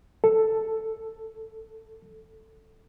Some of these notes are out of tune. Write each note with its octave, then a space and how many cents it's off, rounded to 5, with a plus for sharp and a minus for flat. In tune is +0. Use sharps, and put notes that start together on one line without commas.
A4 +5